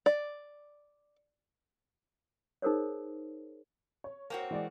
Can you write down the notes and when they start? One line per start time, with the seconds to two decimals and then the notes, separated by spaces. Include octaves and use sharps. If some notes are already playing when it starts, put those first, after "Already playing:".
0.06 D5
2.62 D#4 G#4 A#4 C5 C#5
4.04 C#5
4.30 A#3 C4 F#4
4.51 E3 G#3 D5